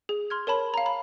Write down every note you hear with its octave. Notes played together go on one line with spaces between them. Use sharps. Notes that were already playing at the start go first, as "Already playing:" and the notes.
G#4
C6 F6 G#6
A#4 C#5 A5 B5
F5 A#5
B5